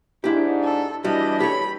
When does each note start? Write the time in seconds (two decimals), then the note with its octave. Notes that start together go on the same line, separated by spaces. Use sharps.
0.24 G#2 D4 E4 G4
0.64 A4
1.04 E3 G3 D4 E4 F#4 D#5
1.40 G4 A4 C#5 B5